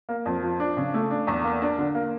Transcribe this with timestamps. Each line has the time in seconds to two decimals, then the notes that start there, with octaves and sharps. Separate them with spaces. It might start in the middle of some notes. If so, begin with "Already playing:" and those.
0.09 A#3
0.26 F2
0.43 F3
0.60 D4
0.77 C#3
0.94 A3
1.11 D4
1.27 E2
1.44 A#3
1.62 D4
1.78 D3
1.95 A#3